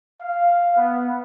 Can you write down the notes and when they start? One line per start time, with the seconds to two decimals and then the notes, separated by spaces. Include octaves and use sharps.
0.21 F5
0.76 B3